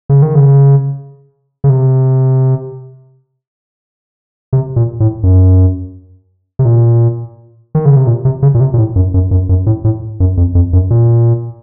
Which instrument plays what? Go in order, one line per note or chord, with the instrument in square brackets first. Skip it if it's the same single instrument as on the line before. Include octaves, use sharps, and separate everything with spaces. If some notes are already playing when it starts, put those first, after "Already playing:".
[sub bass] C#3
D#3
C#3
C#3
C3
C3
A#2
A2
F#2
C3
A#2
D#3
C#3
C3
A#2
C3
C#3
A#2
C3
A#2
A2
F#2
F#2
F#2
F#2
A2
A2
F#2
F2
F2
F#2
A#2